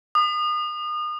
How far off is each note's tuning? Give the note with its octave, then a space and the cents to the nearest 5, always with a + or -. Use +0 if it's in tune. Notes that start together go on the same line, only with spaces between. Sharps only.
D#6 -35